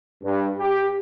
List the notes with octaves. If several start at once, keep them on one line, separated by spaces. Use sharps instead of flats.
G2
G4